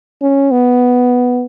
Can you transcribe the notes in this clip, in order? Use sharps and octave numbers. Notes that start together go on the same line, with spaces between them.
C#4
B3